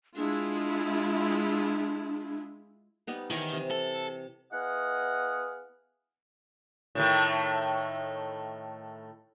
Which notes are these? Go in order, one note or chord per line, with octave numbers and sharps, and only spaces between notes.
G#3 D4 E4 F4
G3 B3 D#4
D#3 E3 G4 C#5
C3
A4
B3 E4 G#4 D#5 F5 F#5
A2 D#3 A3